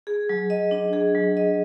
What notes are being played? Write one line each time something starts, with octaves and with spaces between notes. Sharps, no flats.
G#4
F#3
D#5
D4
G#4
F#3
D#5